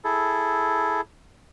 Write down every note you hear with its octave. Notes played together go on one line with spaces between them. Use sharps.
E4 G#4 A4